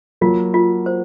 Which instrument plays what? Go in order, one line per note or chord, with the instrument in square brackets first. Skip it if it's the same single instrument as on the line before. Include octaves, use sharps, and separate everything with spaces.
[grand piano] F#3 A#3 [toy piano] F4
[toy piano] F4
C5